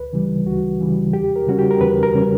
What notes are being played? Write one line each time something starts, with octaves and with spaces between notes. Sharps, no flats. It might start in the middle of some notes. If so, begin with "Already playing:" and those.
Already playing: D2 B4
C#3 E3 G3
D2 F#4
C#3 E3 G3
E2 G4
A#4
C#3 G3 C#4 F#4
G4
A#4
E2 B4
A#4
C#3 G3 C#4